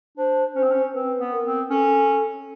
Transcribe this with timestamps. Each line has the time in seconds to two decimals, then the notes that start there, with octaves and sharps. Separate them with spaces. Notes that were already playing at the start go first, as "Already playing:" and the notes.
0.17 D4 C5
0.55 C#4 C5
0.63 C4
0.72 C#4
0.94 C4 B4
1.19 B3
1.32 A#4
1.44 C4
1.70 C#4 A4